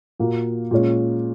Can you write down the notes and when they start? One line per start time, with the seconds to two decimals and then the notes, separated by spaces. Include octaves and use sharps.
0.19 A#2 A#3 F#4
0.71 A#2 G#3 C#4